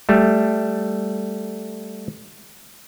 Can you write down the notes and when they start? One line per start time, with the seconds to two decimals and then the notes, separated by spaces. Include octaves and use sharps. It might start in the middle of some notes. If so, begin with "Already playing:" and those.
0.09 G3 A3